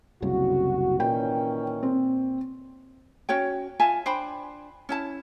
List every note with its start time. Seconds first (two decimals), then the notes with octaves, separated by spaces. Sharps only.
0.22 F#1 C2 C#3 F#4
1.00 A#2 D#3 E3 C#4 G5
1.83 C4
3.29 C#4 F#4 C#5 G5
3.80 F4 E5 G#5 A5
4.06 D4 C5 G5 B5
4.89 C#4 E4 A5